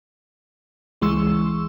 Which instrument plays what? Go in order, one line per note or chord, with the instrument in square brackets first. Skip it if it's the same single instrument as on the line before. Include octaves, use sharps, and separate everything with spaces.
[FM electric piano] C#2 E3 G#3 C6 C#6 E6